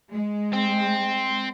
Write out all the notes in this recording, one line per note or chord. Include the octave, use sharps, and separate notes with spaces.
G#3
C4